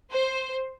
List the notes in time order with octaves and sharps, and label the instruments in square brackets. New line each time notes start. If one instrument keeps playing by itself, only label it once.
[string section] C5